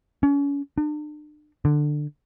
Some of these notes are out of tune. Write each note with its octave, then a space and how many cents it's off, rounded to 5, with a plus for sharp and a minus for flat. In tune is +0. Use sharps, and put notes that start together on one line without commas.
C#4 +35
D4 +40
D3 +15